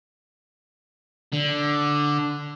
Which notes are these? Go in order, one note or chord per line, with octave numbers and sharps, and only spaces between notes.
D3